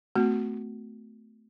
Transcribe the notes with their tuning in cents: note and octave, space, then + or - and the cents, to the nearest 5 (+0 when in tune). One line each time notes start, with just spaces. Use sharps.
A3 +0 C4 -45 F#4 +0